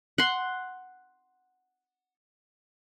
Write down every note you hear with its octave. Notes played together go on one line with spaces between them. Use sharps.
F#5 C6